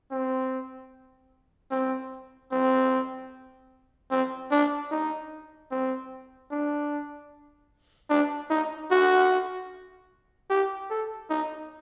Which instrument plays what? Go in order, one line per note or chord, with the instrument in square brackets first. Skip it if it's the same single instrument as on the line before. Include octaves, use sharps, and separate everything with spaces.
[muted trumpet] C4
C4
C4
C4
D4
D#4
C4
D4
D4
D#4
F#4
G4
A4
D#4